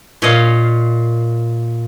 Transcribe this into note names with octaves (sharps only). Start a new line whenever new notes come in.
A#2 C#5 D#5 F5